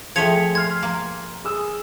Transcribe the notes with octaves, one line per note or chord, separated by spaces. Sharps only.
F3 A3 G#4 E5 G5 G#6 C#7 F7
C6 F6 G#6 C7
A#3
G#4 D#6 E6